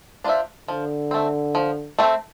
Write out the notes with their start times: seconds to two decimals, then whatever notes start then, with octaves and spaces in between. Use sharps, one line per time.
0.24 D4 F4 C5 E5
0.68 D3 F3
1.11 A3 C4
1.55 F3
1.99 A3 C4